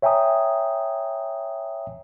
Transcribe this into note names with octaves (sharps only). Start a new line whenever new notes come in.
C#5 E5 G5 G#5 A#5 D#6